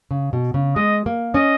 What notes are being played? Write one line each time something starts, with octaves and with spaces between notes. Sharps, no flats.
C#3
B2
C#3
G#3 D#5
A#3
C#4 D#5